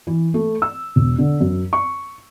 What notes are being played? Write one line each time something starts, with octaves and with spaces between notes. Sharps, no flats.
E3
A3
E6
E1
D3
F#2
C#6